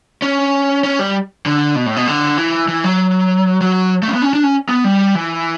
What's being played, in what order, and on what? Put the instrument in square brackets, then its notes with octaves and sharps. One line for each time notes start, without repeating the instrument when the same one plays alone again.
[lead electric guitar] C#4
C#4
G3
D3
B2
A2
B2
D3
E3
E3
F#3
F#3
A3
C#4
B3
C#4
D4
C#4
B3
G3
E3